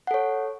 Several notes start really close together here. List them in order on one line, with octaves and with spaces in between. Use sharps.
F#5 A4 C#5